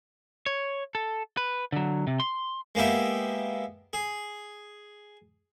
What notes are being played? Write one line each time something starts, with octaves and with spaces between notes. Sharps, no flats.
C#5
A4
B4
D3 F#3
C3
C6
G#3 A#3 B3 G4 E5
G#4